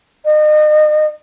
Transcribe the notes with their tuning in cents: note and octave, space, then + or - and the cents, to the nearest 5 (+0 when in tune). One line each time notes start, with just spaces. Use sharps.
D#5 -35